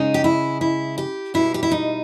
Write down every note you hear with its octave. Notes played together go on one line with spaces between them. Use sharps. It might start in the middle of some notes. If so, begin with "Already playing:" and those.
Already playing: C#3 G#3 D#4
G4
E4
E4
G4
B2 G3 E4
G4
E4
D#4